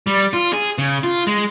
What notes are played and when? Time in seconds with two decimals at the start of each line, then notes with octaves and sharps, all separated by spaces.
0.07 G3
0.33 F4
0.53 G#4
0.78 C#3
1.03 F4
1.27 G#3